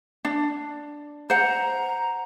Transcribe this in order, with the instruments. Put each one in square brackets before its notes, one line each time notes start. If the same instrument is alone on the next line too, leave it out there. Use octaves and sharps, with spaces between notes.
[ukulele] D4
[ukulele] C5 F#5 [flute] A#5